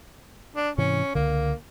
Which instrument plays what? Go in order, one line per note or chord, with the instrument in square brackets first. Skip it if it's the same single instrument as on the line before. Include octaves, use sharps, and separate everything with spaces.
[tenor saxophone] D4
[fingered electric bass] G#2 C3 E3 [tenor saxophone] C#4
[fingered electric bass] C#2 D3 [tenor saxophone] A#3